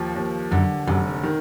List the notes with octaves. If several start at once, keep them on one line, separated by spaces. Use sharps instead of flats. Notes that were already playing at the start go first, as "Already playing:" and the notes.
Already playing: D#2 F3
D#2
F#2 D3
F1 F#2
D#3